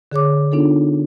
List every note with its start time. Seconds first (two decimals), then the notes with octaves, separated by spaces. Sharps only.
0.12 D3 G#4 C#5 D6
0.52 B3 D4 D#4 F4 A4